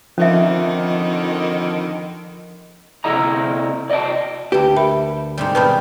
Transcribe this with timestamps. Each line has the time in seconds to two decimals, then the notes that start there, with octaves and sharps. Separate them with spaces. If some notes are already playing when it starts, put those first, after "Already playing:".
0.18 F2 D3 D#3 F3 C#4 E5
3.04 C3 E4 A4 D#5 A#5
3.90 D5 D#5 F#5 G5 A5
4.52 D2 G4 B4 G5
4.76 A#4 E5 B5
5.38 G#2 C3 G3
5.55 B2 D#3 G3 B4 A5 B5